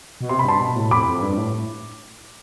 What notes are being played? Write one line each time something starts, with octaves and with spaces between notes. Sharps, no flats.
B2
C3 C6
B5
G2 A5 C6
B2
A2
F2 B5 D6
F2
G2
A2